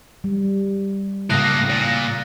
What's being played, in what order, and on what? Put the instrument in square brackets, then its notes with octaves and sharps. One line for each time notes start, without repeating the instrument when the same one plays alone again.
[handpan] G3
[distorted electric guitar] A2 A#3 [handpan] C#3 F5 [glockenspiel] D#6 F#6 [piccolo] A#6
[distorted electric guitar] A#2